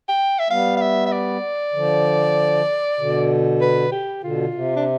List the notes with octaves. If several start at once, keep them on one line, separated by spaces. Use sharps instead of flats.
G5
E5
G3 B3 F5
F5
E5
E5
D5
D3 F3
B2 D3
B4
G4
B2 D3 F4
C3
D4